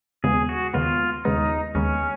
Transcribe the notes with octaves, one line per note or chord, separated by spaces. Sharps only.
D#2 C#3 G#3 B3 G#4
F#4
D#2 C#3 G#3 B3 F4
D#2 C#3 G#3 B3 D#4
D#2 C#3 G#3 B3 C#4